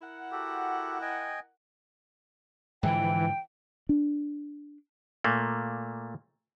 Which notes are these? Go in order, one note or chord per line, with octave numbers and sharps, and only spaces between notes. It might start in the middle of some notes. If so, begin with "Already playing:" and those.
E4 A#4 F#5
F#4 G4 A4
D#5 G5 G#5
G#2 D3 E3 F3 G5
D4
A#2 A3 A#3